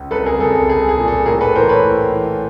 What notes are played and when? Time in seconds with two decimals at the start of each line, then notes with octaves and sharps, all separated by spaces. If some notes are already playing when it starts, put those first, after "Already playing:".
Already playing: C#2
0.11 C2 A4 B4
0.26 G#4 A#4
0.40 C2 A4
0.55 A4
0.69 C2 G#4
0.89 G#4
0.98 A#2
1.08 A4
1.26 A2 G#4 A#4
1.41 A4 B4
1.55 E3 A#4 C5
1.69 B4 C#5
1.84 A2
2.12 E3